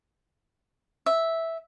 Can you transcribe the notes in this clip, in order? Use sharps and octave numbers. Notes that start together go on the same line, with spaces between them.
E5